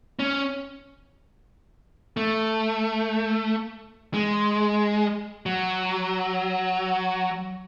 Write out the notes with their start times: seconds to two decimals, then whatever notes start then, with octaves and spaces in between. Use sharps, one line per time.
0.19 C#4
2.17 A3
4.14 G#3
5.46 F#3